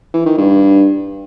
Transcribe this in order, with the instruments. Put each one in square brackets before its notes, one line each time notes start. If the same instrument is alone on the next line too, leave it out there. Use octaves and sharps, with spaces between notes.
[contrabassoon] E3
D#3
G2